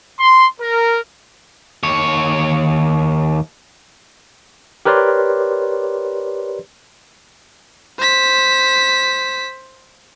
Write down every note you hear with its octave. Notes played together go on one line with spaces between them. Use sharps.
C6
A#4
D#2 C#5
G4 A#4 B4 C#5 D5 C6
C5 B6